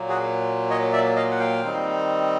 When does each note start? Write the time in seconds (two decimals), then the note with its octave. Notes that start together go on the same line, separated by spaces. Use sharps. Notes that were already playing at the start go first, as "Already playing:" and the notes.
Already playing: A#2 F#3 A#3
0.09 F#4 G#4
0.70 C#5 D#5
0.93 D5 E5
1.16 D#5 F5
1.31 F#5
1.39 F5 G5
1.63 D#3 G3 C4 D#4